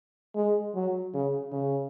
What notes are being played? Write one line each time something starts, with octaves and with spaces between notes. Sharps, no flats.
G#3
F#3
C#3
C#3